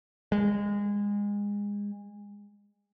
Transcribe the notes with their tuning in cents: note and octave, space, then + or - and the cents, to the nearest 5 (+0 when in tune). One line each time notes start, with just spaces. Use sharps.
G#3 -25